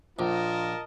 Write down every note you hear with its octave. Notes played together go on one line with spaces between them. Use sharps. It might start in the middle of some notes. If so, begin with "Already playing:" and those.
A#1 F4 A#4 D#5 A5